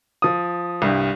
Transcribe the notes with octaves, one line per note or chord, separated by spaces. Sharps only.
F3 D#6
C2 G2